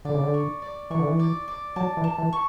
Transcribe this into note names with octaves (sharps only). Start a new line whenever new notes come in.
D3 D5
C#3
D3
C#6
D5
E3 C#6
D3
E3
D5
D5
F#3 A5
E3
A5
E3
C#6